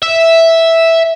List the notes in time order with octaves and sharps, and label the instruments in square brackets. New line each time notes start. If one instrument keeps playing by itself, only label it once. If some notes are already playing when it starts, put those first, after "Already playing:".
[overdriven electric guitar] E5